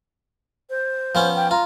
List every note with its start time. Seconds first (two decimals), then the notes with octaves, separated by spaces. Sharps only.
0.70 C5
1.15 F3 B3 C#4
1.36 G5
1.51 F4 A#5